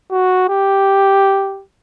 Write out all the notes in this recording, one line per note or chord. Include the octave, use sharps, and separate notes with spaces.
F#4
G4